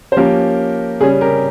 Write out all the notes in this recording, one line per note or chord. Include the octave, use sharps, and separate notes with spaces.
C5
F3 A#3 C#4 G4 A#4
C#3 G3 C#4 G#4
G4 A#4